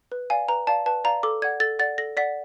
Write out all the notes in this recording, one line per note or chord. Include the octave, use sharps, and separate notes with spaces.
B4
D5 F5 G#5
B4 A#5
D5 F5 A5
B4 A5
D5 F5 A#5
A4 D6
D5 F#5 G#6
A4 A6
D5 F#5 A6
A4 A#6
D5 F#5 B6